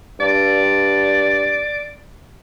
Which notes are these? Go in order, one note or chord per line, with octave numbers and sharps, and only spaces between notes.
G2 D5